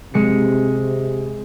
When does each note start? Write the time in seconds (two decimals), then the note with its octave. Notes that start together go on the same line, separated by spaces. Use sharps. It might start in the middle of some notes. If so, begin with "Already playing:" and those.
0.14 C3 G#3 C#7